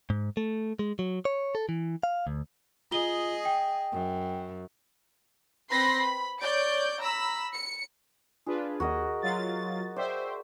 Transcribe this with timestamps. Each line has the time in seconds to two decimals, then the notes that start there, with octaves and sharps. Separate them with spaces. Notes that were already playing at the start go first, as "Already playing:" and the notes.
0.10 G#2
0.37 A3
0.79 G#3
0.99 F#3
1.25 C#5
1.55 A4
1.69 E3
2.03 F5
2.27 D2
2.91 F4 G#4 D#5 G7
3.45 G5
3.92 F#2
5.70 C4 B4 B5 C6 A#6 C7
6.00 B5
6.40 C#5 D5 G6 D7
7.00 A#5 B5 E6
7.55 C#7
8.46 D4 F4 G#4 B4
8.80 D#2 F#4 A#4 D#5
9.22 F#3 F4 A6
9.96 C5 D5 E5 G5